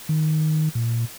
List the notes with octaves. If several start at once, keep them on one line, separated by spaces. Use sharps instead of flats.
D#3
A#2